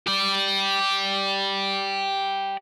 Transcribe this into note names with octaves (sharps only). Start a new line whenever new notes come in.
G4 D5